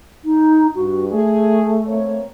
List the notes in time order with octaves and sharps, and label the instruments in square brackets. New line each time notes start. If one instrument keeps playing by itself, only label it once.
[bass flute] D#4
[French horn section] G2 [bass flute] F#4
[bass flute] A3 [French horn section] G#4
[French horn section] A#3 C4 C#5